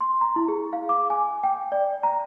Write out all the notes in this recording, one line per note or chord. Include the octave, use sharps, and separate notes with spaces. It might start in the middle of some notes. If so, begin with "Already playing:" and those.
C6
A#5
E4
G#4
F5
D6
G#5
G5
D5
A#5